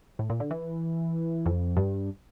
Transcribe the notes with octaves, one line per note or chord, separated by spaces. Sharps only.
A2
A#2
D3
E3
F2
G2